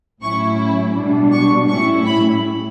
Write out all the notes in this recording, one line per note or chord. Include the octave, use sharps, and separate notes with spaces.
A2 F#3 C#4 E4 C#6
B2 G3 D4
C#6
A2 G3 C#4 E4 C#6
B5